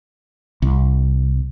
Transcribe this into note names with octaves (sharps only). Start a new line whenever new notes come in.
C2